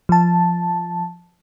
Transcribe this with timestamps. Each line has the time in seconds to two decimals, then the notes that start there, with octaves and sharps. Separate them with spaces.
0.09 F3 A5